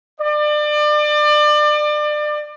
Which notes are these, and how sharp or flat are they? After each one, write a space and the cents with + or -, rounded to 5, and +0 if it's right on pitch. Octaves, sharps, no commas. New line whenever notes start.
D5 +30